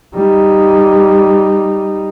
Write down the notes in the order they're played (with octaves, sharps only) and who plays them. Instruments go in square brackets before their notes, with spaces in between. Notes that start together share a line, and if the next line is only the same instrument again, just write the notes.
[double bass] G3 D#4